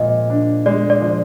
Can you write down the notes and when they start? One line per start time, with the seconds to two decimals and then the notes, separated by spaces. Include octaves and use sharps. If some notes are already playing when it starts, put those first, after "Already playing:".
Already playing: A#2 F3 G#3 D#5
0.30 D4
0.66 G#3 D5
0.90 D5
1.01 F3